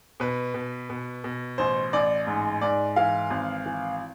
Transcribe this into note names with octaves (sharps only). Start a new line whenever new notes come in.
B2 B4
B2
B2
B2
A1 C5
A1 D5
G#2
G#2 D5
E3 F5
G#1
E3